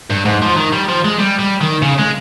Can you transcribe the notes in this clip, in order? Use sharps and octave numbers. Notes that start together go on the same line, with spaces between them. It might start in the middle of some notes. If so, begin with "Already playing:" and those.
G2
G#2
F3
D#3
G3
F3
G#3
G3
G3
D#3
C#3
G#3